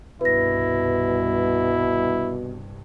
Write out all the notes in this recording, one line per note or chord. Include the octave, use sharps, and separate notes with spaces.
C2 G2 B2 E4 B4 A#6